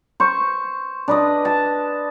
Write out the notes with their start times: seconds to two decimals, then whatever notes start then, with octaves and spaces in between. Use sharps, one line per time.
0.20 C5 C#6
1.08 D4 B4 D#5
1.45 A5